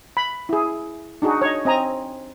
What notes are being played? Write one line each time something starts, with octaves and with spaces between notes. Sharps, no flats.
B5
E4 G#4
D4 D#4 F#4 G#4
C#5 D#5
C4 D#5 G#5 A#5